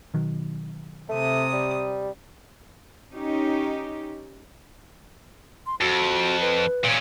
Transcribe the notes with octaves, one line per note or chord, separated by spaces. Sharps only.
B2 D#3 F#3
C3 A3 D#6
G3
C#4 D#4 G4
C6
F2 F#4
B4
A#2 C#4